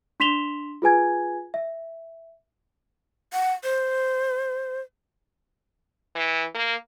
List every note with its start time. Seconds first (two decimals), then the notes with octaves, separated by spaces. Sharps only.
0.20 D4 C6 B6 E7 F7 G7
0.82 F4 G#4 B4 G#5 G#6
1.54 E5
3.33 F#5
3.63 C5
6.15 E3
6.55 A#3